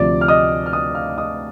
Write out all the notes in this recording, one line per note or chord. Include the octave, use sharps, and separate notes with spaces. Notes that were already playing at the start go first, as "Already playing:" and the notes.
Already playing: D2 C3 F3 D5 D6
F6
D#5 D#6
F6
D#5 D#6
F5 F6
D#5 D#6